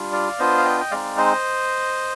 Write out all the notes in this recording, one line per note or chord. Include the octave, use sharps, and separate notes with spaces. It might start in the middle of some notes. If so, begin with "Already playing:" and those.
Already playing: G3 D4 F4
D5 F5
B3 D4 F4 C5 D#5
F5
D#5 G5
G5
G#3 C4 D#4 D5 F5
C5 D#5